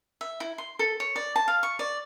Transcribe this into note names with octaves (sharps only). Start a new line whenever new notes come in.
E5
E4
C6
A4
C#5
D5
A5
F5
C#6
D5